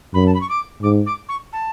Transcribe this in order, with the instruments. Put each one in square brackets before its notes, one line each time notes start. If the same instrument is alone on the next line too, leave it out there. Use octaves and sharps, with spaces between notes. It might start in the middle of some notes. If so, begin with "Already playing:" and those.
[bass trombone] F#2 [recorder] B5
[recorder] A5
B5
C#6
D6
[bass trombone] G#2 [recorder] D6
[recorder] D6
C#6
A5